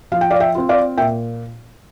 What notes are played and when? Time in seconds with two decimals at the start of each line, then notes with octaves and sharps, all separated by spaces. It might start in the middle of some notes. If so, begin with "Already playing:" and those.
0.12 F3 F5
0.21 G5
0.30 D5 F5
0.40 E5 G5
0.55 C4 F4
0.69 D5 F5
0.98 A#2 E5 G5